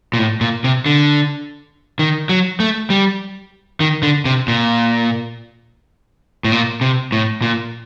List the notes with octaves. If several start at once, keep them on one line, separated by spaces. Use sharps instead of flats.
A#2
A2
A#2
C3
D3
D#3
F#3
A3
G3
D#3
D3
C3
A#2
A2
A#2
C3
A2
A#2